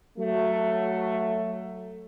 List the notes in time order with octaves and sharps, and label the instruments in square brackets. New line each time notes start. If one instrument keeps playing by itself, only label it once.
[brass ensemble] F#3 A3